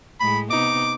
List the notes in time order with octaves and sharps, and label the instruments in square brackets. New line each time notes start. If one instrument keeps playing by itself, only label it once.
[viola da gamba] A2 G#3 [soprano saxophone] B5
[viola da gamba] C3 B3 D#4 [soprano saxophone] D6